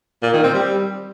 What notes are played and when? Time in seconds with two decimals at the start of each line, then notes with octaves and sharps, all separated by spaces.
0.22 A#2
0.33 D#3
0.44 C4
0.54 G3